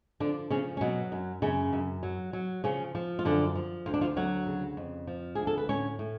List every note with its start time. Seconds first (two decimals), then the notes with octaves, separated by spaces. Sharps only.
0.20 D3 F3 D4
0.50 C#3 F3 C#4
0.77 C#4
0.81 B2 F#3 B3
1.12 F#2
1.42 F#2 C#3 C#4
1.73 F#2
2.03 F#3
2.33 F#3
2.64 C#3 F3 C#4
2.95 F3
3.19 F4
3.25 F#2 D3 D4
3.55 F3
3.86 D2 F4
3.94 D4
4.01 F3 F4
4.16 D2 F#3 F#4
4.47 C#3
4.77 F2
5.07 F3
5.35 D2 G#4
5.47 A4
5.57 B4
5.69 A2 C#4 C#5
5.99 A2